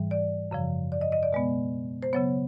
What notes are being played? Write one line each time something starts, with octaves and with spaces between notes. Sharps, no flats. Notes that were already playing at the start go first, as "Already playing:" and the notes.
Already playing: G#2 E3 G3
D5
F#2 C#3 F3
D5
D#5
D#5
D5
B2 G#3 B3
C5
C#3 F#3 B3 C#5